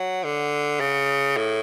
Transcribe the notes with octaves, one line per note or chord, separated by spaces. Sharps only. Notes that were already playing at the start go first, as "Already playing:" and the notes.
Already playing: F#3
D3
C#3
A2